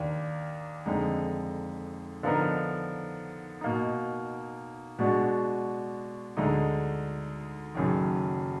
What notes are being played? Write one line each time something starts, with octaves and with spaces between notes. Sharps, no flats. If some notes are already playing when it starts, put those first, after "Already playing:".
Already playing: D#2 D#3 A#3 D4
F2 D3 G#3 D#4
D3 F3 B3 D#4 A#4
B2 A#3 D#4
B2 G#3 D4 F#4
D2 D3 G#3 D#4
F#1 F#2 D#3